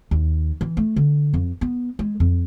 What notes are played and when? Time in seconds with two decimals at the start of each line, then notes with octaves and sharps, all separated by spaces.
0.11 D#2
0.61 E3
0.77 A3
0.96 D3
1.33 F2
1.61 B3
1.99 G#3
2.20 F2